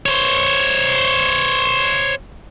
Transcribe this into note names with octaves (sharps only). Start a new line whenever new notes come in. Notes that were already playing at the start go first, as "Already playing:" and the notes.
C5 C#5